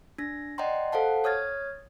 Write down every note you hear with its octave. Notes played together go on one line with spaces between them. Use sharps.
D4 A#6
D5 D#5 F#5 G5 A#5 C6
A4 C5 F5 F#5 A5
C#5 D#6 F6 G#6 A6